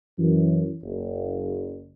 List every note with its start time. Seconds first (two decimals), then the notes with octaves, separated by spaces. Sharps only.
0.19 F#2 E3
0.83 F#1